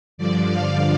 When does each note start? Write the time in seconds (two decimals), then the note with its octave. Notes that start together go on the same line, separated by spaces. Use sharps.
0.18 G2 D3 F3 D5
0.49 F5